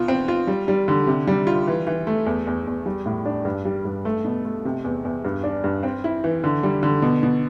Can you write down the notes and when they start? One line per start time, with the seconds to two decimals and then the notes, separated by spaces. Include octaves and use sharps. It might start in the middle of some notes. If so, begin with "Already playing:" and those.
Already playing: B2 F4
0.08 C4
0.28 F4
0.47 G3
0.68 G3
0.88 D3
1.07 C3
1.27 G3
1.47 F4
1.67 E3
1.87 E3
2.07 A3
2.26 E2
2.47 E2
2.67 E2
2.86 G3
3.06 A2
3.26 D4
3.45 G2
3.65 G3
3.85 G2
4.05 A3
4.25 B2
4.45 A3
4.65 C3
4.85 E2
5.05 E2
5.25 G2
5.44 D4
5.64 G2
5.83 C4
6.04 E4
6.24 E3
6.44 D3
6.63 G3
6.83 D3
7.02 B2
7.23 B2